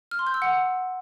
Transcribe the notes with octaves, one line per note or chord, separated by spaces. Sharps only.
F6
C6
G6
E6
F#5